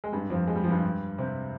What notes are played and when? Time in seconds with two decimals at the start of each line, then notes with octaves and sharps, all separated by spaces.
0.04 G#3
0.12 G2 G3
0.30 F2 F3
0.47 G#3
0.55 G3
0.64 F3
0.71 G2 G3
1.18 C3 C4